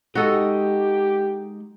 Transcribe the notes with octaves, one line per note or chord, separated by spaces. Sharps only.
G#3 D#4 F#4 G4 A4 D#5